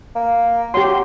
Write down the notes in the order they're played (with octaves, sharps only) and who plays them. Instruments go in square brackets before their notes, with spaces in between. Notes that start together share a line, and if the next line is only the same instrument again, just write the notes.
[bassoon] A#3
[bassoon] F#3 [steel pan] G4 C6